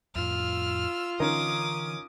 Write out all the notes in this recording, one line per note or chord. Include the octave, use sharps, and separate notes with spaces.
F2 A2 F4 E6 F6
D3 E3 C#4 D#4 A#4 D6 D#6